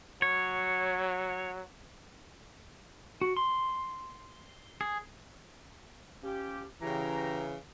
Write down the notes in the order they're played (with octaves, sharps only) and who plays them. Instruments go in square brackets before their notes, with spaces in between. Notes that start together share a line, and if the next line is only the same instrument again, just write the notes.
[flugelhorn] F#3 [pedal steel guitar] C#5
[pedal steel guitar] F#4
C6
G#4
[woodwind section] F3 C#4 G4
[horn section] C#3 E3 [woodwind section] G4 G5 A#5